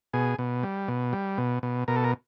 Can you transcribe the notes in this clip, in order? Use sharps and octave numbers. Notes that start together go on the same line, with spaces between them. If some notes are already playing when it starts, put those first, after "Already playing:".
B2 G#4
B2
G3
B2
G3
B2
B2
B2 A#4
A4
A#4